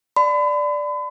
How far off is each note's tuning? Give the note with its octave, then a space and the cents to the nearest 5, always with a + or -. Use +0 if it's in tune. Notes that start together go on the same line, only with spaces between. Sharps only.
D5 +0 B5 +40